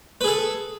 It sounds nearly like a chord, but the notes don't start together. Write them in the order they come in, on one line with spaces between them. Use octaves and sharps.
B4 G#4 A4